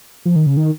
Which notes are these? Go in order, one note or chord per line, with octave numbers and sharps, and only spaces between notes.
F3
D#3
C#3
D#3